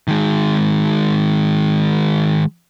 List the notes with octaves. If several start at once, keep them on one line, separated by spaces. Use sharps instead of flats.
D#3 G#3